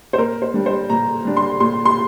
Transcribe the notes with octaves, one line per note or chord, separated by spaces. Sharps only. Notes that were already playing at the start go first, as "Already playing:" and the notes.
C5
A#2 A#4
C5
G3 D4
C5
A#2 A#5
G3 D4
C6
A#2 C6
C6